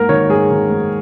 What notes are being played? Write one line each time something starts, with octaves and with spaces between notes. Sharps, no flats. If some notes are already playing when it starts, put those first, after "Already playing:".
Already playing: G#2 A#3 A#4
D#3 C#5
G#2 G#4
D#3
G#2